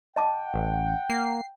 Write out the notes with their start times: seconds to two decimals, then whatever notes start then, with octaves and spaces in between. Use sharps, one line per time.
0.16 D#5 F#5 G5 A5 D6
0.54 A1
1.10 A#3 C7